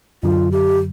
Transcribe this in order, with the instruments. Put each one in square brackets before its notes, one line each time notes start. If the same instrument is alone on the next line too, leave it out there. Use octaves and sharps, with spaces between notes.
[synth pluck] F#2 D3 F#3 [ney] F4
[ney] G4